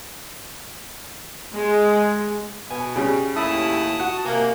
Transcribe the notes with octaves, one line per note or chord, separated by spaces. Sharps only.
G#3
B2 B3 G#5
C#3 G3
D#2 A2 E4 A5 D#6
F#4
C3 A#3 G#5